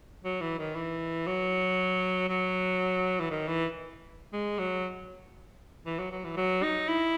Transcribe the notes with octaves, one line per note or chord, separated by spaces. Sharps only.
F#3
E3
D#3
E3
F#3
F#3
E3
D#3
E3
G#3
F#3
E3
F#3
F#3
E3
F#3
D#4
E4